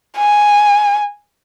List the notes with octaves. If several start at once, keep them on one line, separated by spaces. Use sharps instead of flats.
G#5